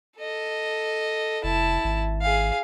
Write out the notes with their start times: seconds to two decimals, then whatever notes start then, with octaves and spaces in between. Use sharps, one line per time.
0.18 A4 D#5
1.44 F1 E4 A5
1.84 G#1
2.21 G#4 F5